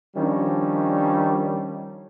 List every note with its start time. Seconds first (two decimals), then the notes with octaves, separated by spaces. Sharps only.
0.16 D#3 F3 G3 C#4 D4